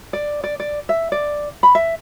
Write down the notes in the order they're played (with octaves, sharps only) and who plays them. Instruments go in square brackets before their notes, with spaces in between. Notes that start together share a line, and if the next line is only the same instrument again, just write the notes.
[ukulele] D5
D5
D5
E5
D5
B5
E5